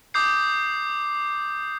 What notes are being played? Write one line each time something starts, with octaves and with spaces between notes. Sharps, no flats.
D6 D#6 G6 C7